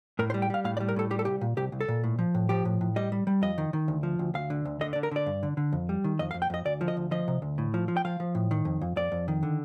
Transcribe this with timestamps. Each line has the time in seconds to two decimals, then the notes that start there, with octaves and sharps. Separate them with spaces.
0.19 A2 A#4
0.30 C5
0.34 G3
0.42 G5
0.50 G3 F5
0.64 A2 F5
0.77 D5
0.80 G3
0.89 A#4
0.96 A2 A4
1.11 G3 G4
1.19 A4
1.25 C2 G4
1.41 A#2
1.57 C2 G4
1.72 C2
1.81 A4
1.88 A#2
2.04 A2
2.19 F3
2.35 A2
2.49 F3 G4
2.65 A2
2.81 A2
2.96 G3 D#5
3.12 G3
3.27 G3
3.42 F2 D#5
3.58 D#3
3.73 D#3
3.88 D2
4.03 F3
4.19 D2
4.34 D2 F5
4.50 D3
4.65 D2
4.81 D3 D#5
4.93 D5
4.96 D3
5.03 A#4
5.11 D3 D5
5.26 G2
5.43 D3
5.57 D3
5.73 F2
5.89 G3
6.04 D#3
6.19 F2 D#5
6.31 F5
6.34 F2
6.42 G5
6.50 F2 D#5
6.65 D2 D5
6.81 F3
6.88 D#5
6.97 D2
7.11 F3 D#5
7.28 C3
7.42 D2
7.58 A2
7.74 F3
7.88 F3
7.97 G5
8.05 F3 F5
8.20 F3
8.35 A2
8.51 D#3
8.65 F2
8.81 F2
8.96 F2 D5
9.12 F2
9.28 D#3
9.43 D3